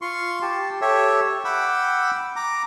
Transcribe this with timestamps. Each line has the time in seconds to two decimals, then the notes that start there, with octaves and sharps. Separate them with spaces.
0.02 F4 C6 C#6
0.42 G4 A5
0.81 G4 A4 C#5 E5
1.45 F#5 G5 B5 D6 E6
2.36 A#5 D6